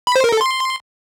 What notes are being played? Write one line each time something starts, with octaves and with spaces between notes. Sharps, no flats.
B5
C5
A#4
A4
C6